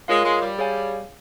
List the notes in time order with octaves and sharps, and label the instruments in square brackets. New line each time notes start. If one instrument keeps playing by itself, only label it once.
[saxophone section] G#3 [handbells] F4 A#4 C#5 F5
[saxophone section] G#3
G3
[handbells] G#4 C#5 F5 G#5